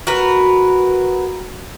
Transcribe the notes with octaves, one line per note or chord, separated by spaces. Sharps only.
F#4 A#4 B4